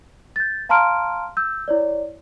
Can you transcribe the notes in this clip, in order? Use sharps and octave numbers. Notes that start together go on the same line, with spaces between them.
G6 A6
F5 A5 A#5 C6 F6 D7
E6 G6
E4 C#5 D5